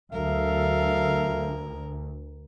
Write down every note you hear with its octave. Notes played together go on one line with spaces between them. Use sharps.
D2 F#3 A4 A#4 E5 F5